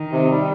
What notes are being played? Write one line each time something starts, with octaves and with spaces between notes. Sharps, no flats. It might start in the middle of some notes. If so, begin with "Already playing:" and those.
Already playing: D#3
C3
G3